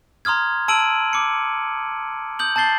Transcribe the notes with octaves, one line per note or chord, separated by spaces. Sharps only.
A#5 C6 D#6 F6 G#6
A5 E6 D7 D#7 F#7
D6 C#7
D#6 G6 F#7
A5 G6 A6 C7 G7